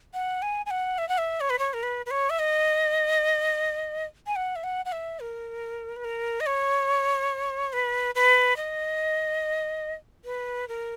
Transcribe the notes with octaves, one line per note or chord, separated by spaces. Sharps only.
F#5
G#5
G#5
F#5
E5
F#5
E5
C#5
B4
C#5
A#4
B4
B4
C#5
E5
D#5
G#5
F#5
E5
F#5
F#5
E5
A#4
B4
A#4
D#5
C#5
B4
B4
D#5
B4
A#4